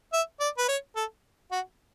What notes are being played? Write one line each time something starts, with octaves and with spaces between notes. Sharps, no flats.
E5
D5
B4
C#5
A4
F#4